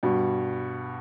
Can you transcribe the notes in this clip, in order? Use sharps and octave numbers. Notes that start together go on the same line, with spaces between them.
G2 B2